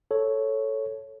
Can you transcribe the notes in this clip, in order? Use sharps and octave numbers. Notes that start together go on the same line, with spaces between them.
A4 C#5